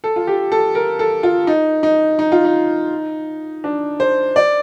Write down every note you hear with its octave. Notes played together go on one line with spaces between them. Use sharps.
A4
F4
G4
A4
A#4
A4
F4
D#4
D#4
D#4
F4
D#4
D4
C5
D5